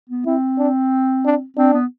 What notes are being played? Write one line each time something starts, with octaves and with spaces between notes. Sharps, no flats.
B3
C4 E4
D4
D4
C4 D4
B3